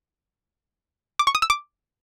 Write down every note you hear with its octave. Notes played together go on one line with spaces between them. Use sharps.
D6
C#6
D#6
E6
D6